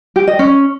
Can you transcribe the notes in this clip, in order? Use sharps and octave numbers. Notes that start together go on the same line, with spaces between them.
G4
D#5
C#4